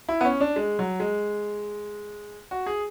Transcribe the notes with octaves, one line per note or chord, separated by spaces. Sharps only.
E4
B3
C#4
D4
G#3
F#3
G#3
F#4
G#4